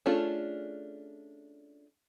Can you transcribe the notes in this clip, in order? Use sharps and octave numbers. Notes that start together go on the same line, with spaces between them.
A3 C#4 D4 F4 G#4